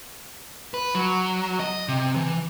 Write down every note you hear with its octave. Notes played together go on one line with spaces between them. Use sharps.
B4
F#3
D#5
C3
E3